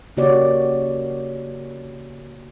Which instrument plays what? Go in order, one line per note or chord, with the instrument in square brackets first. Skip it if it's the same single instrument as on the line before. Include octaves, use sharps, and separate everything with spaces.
[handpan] C#3 A#3 F#4 G4 C#5 D5